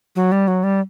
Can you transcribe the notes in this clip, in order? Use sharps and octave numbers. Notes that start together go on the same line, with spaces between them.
F#3
G3
F#3
G3